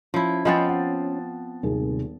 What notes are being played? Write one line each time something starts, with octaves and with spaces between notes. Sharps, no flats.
F3 C#4 E4
F3 B3 C4 D#5 G#5 A6
F#5
D#1 G#1 C3 G#4